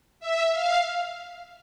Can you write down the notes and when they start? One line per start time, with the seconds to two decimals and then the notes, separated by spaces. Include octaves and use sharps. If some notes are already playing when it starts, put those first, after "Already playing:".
0.20 E5
0.52 F5